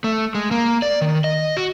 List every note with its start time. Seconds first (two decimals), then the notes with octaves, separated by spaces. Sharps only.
0.04 A3
0.35 G#3
0.51 A#3
0.82 D5
1.01 D#3
1.24 D#5
1.57 F#4